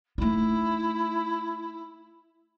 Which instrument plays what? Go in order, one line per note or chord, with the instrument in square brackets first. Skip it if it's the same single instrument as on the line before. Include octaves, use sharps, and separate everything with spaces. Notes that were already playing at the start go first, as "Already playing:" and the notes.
[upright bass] A3 D#4 [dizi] E4